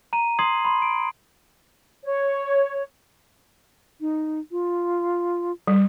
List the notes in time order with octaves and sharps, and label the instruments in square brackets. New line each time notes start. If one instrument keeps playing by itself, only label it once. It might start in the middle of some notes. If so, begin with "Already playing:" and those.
[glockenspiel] A#5 D#7
C6 D#6 G#6 C7 F#7
B5 C6
D7
[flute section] C#5
[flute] D#4
F4
[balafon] G3